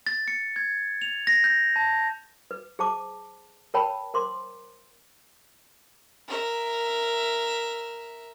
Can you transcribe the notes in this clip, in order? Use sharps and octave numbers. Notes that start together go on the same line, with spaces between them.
A6
C#7
G#6
F7
A#6
G6
A5
B4
G#4 C5 A5 D6
A#4 B4 C#5 G5 A5 B5
A#4 C5 C6 D6
A#4 E5